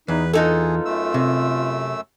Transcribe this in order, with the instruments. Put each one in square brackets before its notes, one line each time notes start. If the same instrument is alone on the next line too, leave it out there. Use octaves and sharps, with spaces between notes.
[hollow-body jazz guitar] E2 [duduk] D#4 [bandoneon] B4
[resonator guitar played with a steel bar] B3 D#4 A4 [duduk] F4 [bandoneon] G#4
[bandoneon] F#2 A3 E6
[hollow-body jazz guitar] C3